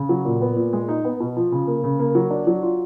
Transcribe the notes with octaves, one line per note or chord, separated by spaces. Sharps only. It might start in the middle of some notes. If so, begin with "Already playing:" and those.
Already playing: C#3
F#3
A#2
B3
A#2
G#3
D#4
B3
B2
F3
C#3
A#3
C#3
A#3
F#3
D4
F#3
F4